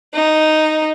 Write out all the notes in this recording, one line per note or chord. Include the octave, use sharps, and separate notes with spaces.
D#4